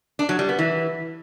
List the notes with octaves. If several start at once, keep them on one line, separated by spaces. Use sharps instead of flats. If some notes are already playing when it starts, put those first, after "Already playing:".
D4
F#3
G3
B3
E3